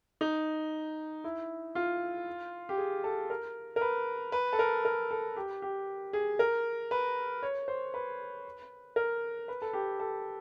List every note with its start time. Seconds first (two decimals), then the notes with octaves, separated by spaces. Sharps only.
0.21 D#4
1.24 E4
1.75 F4
2.69 G4
2.78 G#4
3.04 A4
3.30 A#4
3.76 A#4
3.81 B4
4.32 B4
4.53 A4
4.59 A#4
4.85 A#4
5.11 A4
5.36 G4
5.62 G4
6.13 G#4
6.39 A#4
6.91 B4
7.43 C#5
7.68 C5
7.94 B4
8.96 A#4
9.48 B4
9.62 A4
9.73 G4
10.00 A4